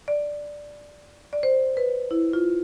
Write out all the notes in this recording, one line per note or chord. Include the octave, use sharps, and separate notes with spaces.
D5
D5
C5
B4
E4
F4